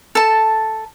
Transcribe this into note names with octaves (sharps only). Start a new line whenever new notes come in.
A4 A5